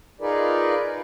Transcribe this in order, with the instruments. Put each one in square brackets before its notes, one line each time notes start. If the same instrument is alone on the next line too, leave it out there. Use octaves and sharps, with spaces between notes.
[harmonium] D#4 F4 G#4 A#4 B4 D5